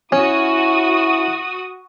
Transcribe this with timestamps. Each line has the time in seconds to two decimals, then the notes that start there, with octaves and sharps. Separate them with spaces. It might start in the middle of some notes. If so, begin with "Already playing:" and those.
0.12 C#4 E4 F#4 D#6